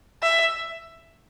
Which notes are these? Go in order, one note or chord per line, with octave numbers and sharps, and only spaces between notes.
E5